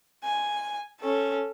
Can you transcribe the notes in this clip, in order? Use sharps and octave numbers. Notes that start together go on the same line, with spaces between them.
G#5
C#4 A4